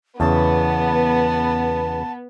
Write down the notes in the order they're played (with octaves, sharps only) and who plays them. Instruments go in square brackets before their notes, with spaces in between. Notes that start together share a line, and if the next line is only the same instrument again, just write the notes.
[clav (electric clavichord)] E2 C#3 [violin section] B3 [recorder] A5